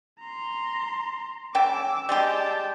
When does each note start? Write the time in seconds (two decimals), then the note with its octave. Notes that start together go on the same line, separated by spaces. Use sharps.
0.20 A#5 C6
1.55 C#3 G5 A5 D6 E6
2.09 G3 G#3 G4 G5 A5